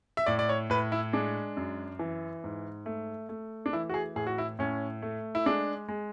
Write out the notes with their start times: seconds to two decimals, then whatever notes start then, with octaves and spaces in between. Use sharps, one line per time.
0.17 E5
0.26 A2 D5
0.39 D5
0.49 C#5
0.70 A2 B4
0.92 E4
1.13 G#3 D4
1.57 F#2
1.99 E3
2.44 G#2
2.86 A3
3.29 A3
3.66 D4
3.73 E3 E4
3.89 F#4
3.94 G#4
4.16 A2 G#4
4.27 F#4
4.38 E4
4.59 A2 C#4
5.02 A3
5.35 E4
5.46 G#3 D4
5.88 G#3